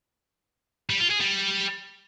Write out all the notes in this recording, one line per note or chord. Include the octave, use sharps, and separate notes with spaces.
G3
F4
G#4
G3